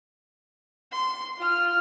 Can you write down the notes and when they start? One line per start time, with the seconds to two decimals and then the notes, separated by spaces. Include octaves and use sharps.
0.92 C6
1.38 F4 F6